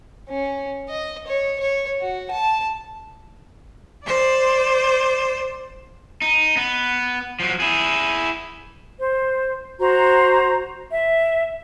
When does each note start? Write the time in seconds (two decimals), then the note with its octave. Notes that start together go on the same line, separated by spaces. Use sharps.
0.29 C#4
0.89 D#5
1.27 C#5
1.60 C#5
2.01 F#4
2.31 A5
4.06 C5 D5
6.22 D#4
6.57 B3
7.40 F3 F#3
7.60 E4 G#4
8.99 C5
9.80 F#4 C5 A#5
10.90 E5